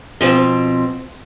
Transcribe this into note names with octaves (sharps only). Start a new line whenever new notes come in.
B2 F3 C4